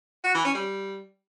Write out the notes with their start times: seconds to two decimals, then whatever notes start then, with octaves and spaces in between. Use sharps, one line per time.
0.24 F#4
0.34 E3
0.45 C#4
0.55 G3